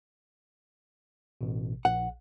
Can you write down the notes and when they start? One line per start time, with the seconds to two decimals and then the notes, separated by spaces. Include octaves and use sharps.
1.41 A1 B2
1.85 A#1 F#5